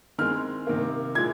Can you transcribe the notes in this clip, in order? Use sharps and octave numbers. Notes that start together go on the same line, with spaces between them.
D#3 G#3 C4 F6
C3 D#3 A#3
A#2 G#3 G#6